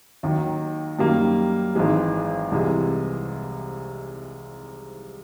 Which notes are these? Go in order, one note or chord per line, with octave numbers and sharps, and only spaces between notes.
D#2 D#3 F#3
F#2 D#3 G3 A#3
G#1 G#2 E3 G#3
C2 C3 E3 G#3